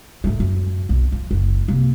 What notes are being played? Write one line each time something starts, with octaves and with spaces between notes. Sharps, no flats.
G#2 A3
F#2
B1
F3
F#1
C3 A#3